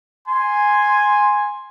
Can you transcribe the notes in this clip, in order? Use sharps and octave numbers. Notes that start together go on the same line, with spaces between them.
G#5 C6